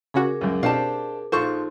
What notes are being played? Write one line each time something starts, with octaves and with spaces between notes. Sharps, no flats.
C#3 C#4 F#4 G#4 A#4 D6
C#2 F#2
B2 C4 D4 G4 F5 A5
A#1 D#4 F4 A4 C5 C6 C#6